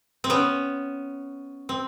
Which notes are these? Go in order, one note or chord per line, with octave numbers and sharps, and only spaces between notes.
C4
B3 C#4
C4